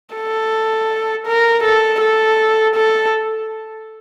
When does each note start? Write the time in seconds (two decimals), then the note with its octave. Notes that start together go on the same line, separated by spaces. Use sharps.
0.15 A4
1.27 A#4
1.63 A4
2.00 A4
2.75 A4